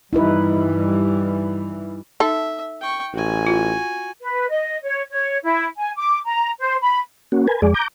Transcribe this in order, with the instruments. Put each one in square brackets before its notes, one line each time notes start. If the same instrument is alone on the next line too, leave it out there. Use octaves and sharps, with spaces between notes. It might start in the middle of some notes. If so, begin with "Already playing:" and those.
[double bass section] G2 E3 G3 [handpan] D#4 E4 B4
[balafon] D#4 [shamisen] A4 [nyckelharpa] E5
[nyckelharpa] G5 C#6
[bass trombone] A1 [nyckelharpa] F#4 G#5
[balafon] F4
[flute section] B4
D#5
C#5
C#5
E4
G#5
D6
A#5
C5
B5
[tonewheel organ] A#3 C#4 F#4
A#4 B4 G#5
F2 G#3 G#4 D5
A#5 D6 G6